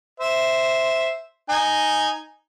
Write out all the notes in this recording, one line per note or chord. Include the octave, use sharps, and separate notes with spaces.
C5 E5
D#4 G#5